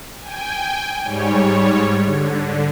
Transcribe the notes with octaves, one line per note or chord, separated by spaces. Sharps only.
G5 G#5
G#2 G3 C#5
D3